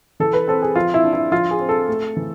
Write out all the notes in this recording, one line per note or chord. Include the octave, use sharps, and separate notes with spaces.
E3 A4
B4
C4 A4
G#4
F3 F4
E4
D4
E4
F3 F4
G#4
C4
A4
A3
E3